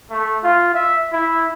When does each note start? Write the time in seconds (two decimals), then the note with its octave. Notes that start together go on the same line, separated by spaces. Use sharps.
0.10 A3
0.44 F4
0.75 E5
1.12 E4